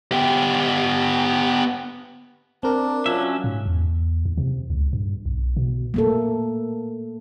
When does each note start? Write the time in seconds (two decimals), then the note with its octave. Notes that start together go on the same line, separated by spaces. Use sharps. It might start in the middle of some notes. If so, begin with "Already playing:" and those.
0.12 B3 G4
2.63 C4 D4 A#4
3.06 F#3 C#4 F4 E5
3.44 G#2
3.66 E2
4.25 D#2
4.37 C3
4.70 C#2
4.93 G2
5.26 B1
5.57 B2
5.94 A3 A#3 A4